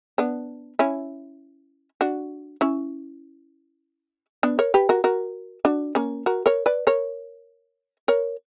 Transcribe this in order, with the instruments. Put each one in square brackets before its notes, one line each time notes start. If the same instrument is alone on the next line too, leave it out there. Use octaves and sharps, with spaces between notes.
[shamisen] B3 D4
C#4 E4
D4 F#4
C#4 E4
B3 D4
A#4 C#5
G4 B4
F#4 A#4
F#4 A#4
D4 F#4
A#3 C#4
F#4 A#4
A#4 C#5
B4 D5
A#4 C#5
A#4 C#5